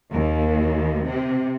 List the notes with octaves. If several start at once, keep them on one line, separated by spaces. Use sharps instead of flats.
D#2
C3